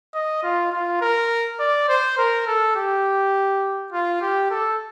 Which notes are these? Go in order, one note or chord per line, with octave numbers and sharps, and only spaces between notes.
D#5
F4
F4
A#4
D5
C5
A#4
A4
G4
F4
G4
A4